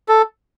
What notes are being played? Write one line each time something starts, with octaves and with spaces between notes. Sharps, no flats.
A4